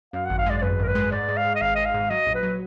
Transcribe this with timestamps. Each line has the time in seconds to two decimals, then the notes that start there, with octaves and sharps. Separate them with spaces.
0.13 F#2 F5
0.25 G#1 F#5
0.38 F5
0.46 G#3 D5
0.58 D5
0.62 F#2 B4
0.79 G#1 A#4
0.87 B4
0.95 G#3
1.12 G#2 D5
1.28 G#2
1.37 F5
1.45 G#2
1.55 D#5
1.61 G#1 F5
1.75 G#1 D#5
1.85 F5
1.94 G#2
2.10 F#3 D#5
2.26 A#1
2.35 B4
2.43 F#3